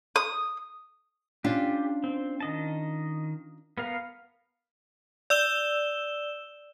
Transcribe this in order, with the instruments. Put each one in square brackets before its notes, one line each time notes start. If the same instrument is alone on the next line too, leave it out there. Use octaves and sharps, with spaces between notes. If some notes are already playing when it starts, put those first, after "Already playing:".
[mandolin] D#6
[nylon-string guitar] C#4 D4 F4 [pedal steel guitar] G4
[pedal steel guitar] C4
D#3 D#5 A5
B3 A#4 F5
[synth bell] D5 E6 E7 G7